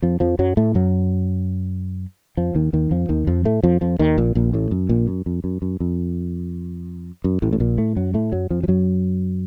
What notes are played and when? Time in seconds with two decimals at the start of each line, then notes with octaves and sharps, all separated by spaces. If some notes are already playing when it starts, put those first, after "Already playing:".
0.02 F2 F3
0.20 F2 F3
0.39 F#2 F#3
0.57 A2 A3
0.75 F#2 F#3
2.37 F2 F3
2.55 D#2 D#3
2.73 D#2 D#3
2.91 F2 F3
3.09 D#2 D#3
3.27 F2 F3
3.45 A2 A3
3.63 F2 F3
3.81 F2 F3
3.99 D#2 D#3
4.18 A#1 A#2
4.35 A#1 A#2
4.53 A1 A2
4.71 F#2
4.89 A#1 A#2
5.08 F#2
5.26 F2
5.44 F#2
5.62 F#2
5.80 F2
7.24 F#2
7.42 A1 A2
7.53 A2
7.60 A#1 A#2
7.78 A2 A3
7.96 F#2 F#3
8.14 A2 A3
8.32 F#2 F#3
8.50 F2 F3
8.63 F3
8.68 F#2 F#3